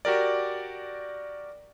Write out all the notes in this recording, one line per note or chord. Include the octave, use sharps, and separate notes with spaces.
F#4 G4 A#4 D5